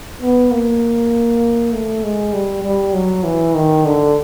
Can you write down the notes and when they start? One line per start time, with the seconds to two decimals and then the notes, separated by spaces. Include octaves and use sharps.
0.22 B3
0.51 A#3
1.73 A3
2.04 G#3
2.33 G3
2.64 G3
2.94 F#3
3.24 E3
3.55 D#3
3.86 D3